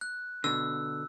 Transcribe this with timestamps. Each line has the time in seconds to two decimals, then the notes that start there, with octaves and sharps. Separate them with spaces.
0.01 F#6
0.44 B2 D3 E6